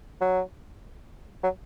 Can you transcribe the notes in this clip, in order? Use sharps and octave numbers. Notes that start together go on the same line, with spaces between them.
F#3
F#3